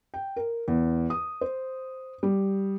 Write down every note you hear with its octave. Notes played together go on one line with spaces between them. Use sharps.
G5
A#4
E2
D#6
C5
G3